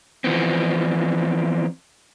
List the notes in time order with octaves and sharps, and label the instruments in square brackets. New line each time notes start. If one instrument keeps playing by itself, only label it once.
[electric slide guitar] E3 F3 B3 C4